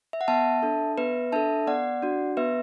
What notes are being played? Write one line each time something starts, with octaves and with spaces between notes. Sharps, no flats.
E5
F#5
B3 E5 A5
D4 A4
B3 B4 E5
D4 A4 E5 A5
B3 D5 F#5
D4 F#4
B3 B4 E5